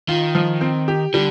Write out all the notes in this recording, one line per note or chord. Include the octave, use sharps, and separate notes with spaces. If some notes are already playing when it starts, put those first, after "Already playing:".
D#3 F4
F3
C4
G4
D3 G3